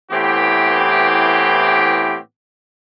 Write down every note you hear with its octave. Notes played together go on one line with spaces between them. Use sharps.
A2 E3 B3 C4 G4